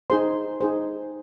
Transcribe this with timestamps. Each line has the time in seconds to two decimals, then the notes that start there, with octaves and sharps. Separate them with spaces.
0.10 D#4 G#4 C5 C6
0.61 D#4 G#4 C5